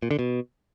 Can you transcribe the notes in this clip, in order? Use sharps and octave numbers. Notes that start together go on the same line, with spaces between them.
A#2
D3
B2